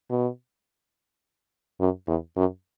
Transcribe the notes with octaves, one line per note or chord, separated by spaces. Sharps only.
B2
F#2
E2
F#2